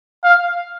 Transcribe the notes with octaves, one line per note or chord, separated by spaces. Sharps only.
F5